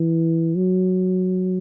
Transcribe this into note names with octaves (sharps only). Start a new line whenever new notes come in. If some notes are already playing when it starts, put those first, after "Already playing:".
Already playing: E3
F#3